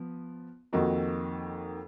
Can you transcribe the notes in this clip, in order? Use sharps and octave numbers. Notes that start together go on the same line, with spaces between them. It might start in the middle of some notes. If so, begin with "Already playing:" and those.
Already playing: F3 B3
F2 D#3 A#3 D#4 F#4